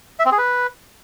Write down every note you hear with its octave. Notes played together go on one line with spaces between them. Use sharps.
E5
C4
G#4
B4